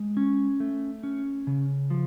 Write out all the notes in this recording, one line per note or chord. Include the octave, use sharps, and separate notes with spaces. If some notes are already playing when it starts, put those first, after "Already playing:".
Already playing: G#3
C#4
A3
C#4
C#3
F3